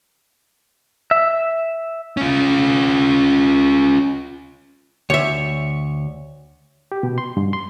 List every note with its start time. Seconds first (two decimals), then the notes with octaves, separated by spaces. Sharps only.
1.11 E5
2.17 C#4 F4
5.10 D2 C#5 E5
6.92 G4
7.03 B2
7.18 C6
7.37 G2
7.53 C6